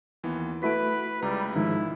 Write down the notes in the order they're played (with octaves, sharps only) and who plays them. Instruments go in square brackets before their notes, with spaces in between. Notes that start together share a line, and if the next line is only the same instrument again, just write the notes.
[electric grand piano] D#2 E3 B3
[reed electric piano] A3 E4 F#4 [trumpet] B4 [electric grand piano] B6 D7
[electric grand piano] C#2 A#5 [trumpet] G3
[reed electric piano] G#2 D#3 F3 [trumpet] E4